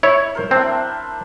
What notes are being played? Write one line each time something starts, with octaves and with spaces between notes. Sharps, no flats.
E4 C#5
A#4 C5
C4 D4 E4